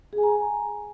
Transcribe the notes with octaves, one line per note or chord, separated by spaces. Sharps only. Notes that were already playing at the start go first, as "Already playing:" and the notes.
G#4
G#5
A#5